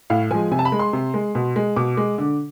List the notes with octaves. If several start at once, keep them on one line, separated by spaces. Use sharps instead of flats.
A2 F5
F3 G#3 G#5
C3 G#5
A5
B5
G#3
C6
C3
G#3
B2
G#3
B2 D6
G#3
D3